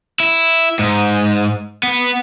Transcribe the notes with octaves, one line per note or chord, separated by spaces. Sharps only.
E4
G#2
B3